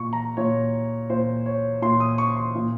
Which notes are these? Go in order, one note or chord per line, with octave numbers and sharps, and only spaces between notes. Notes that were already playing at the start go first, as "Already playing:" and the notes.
Already playing: A#2 C#6
A#5
A#2 C#5
A#2 C5
C#5
A#2 C6
D#6
C#6
C6
A#2